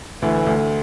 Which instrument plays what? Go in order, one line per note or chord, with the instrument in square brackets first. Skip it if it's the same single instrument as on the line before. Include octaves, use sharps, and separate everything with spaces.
[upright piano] D2 [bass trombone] E3
[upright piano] D2